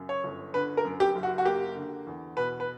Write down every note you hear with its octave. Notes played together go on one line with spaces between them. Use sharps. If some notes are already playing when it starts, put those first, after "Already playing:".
Already playing: F#2 C#3
C#5
G1
D3 B4
A#4
F#2
G4
F#1
F#4
F#4
A#3 G4
D3
E2
B2 B4
B4